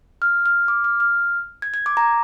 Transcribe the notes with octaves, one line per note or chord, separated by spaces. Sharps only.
F6
F6
D6
F6
F6
G#6
G#6
D6
A#5